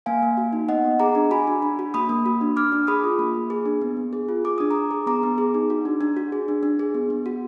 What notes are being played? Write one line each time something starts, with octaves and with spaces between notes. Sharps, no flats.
A#3 F5 G#5
A#3
F#4
D#4
B3 D#5 F#5
B3
G#4 A#5 D6
D4
F#4 G#5 B5
D4
D4
F#4
A#3 B5 D#6
A#3
F#4
D4
D4 D6 F6
D4
G#4 B5 D#6
F4
A#3
A#3
G#4
D4
B3
B3
G#4
F4
G#4 D6
D4 D#6
D4 A#5 D6
G#4
B3 A#5 D6
B3
G#4
D#4
F#4
D4
D4
F#4
G#4
D4
D4
G#4
B3
B3
F#4